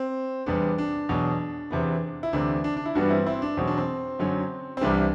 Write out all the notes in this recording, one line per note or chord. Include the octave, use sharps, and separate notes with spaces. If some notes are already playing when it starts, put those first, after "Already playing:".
Already playing: C4
E2 C3 G3 B3 D4
D4
E2 B2 F#3
E2 C3 E3 B3
E4
D2 C3 E3 A3 D4
D4
D4
E4
G2 E3 G3 B3 D4 F#4
C4 E4
C4 E4
D4
E2 B2 F#3 C4
D4
C4
F#2 D3 F#3
C4
C2 C3 E3 G3 D4